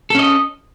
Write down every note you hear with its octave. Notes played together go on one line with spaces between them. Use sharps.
C#4 A4 D#5